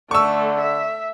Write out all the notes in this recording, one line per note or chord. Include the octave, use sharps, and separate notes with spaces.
D3 A3 C#6 E6
E5